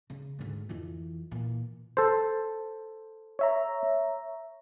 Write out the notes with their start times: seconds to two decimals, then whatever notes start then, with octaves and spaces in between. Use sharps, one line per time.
0.10 C#3
0.39 D2 G#2
0.69 F2 E3
1.31 A#2 E3
1.97 A4 C5
3.39 C#5 E5 A#5